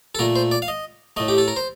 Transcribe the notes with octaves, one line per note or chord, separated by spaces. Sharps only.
A4
A#2 A3 A#4
C5
D5
F5
D#5
A2 A3 D#5
G4
A4
A#4
C5